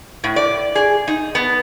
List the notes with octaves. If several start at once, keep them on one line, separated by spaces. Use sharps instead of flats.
A2
D5
G#4
D#4
B3